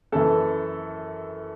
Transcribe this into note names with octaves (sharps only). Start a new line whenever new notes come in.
F#2 E3 A4